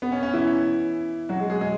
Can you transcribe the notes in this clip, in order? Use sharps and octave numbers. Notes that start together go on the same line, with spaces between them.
B3
C#4
C#4
E3 E4
F#3 F#4
G#3 G#4
G#3 G#4
G#3 G#4